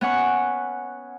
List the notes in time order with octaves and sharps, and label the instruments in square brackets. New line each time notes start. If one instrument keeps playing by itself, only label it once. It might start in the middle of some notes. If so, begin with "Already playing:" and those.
[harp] B3 C#4 F#5 C#6